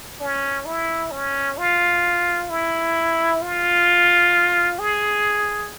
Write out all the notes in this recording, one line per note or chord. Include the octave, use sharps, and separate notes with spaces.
C#4
E4
C#4
F4
E4
F4
G#4